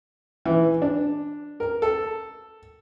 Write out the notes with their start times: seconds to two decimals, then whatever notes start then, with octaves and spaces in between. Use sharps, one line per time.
0.46 E3
0.82 D4
1.60 A#4
1.82 A4